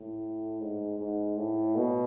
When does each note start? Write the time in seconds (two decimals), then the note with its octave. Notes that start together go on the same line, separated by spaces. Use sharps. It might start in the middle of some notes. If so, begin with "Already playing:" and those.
Already playing: A2
0.61 G#2
0.98 G#2
1.37 A2
1.76 B2